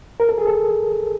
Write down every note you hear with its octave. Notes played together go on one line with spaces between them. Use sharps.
A#4
A4
G#4
A4